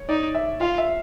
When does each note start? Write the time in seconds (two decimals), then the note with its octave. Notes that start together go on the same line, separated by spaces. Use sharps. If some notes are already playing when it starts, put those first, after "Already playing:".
Already playing: C#5
0.09 D#4 D5
0.35 E5
0.60 F4 F5
0.78 E5